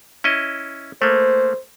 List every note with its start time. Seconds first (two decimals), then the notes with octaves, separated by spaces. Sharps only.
0.24 C#4 E4 D#5
1.02 A3 A#3 C5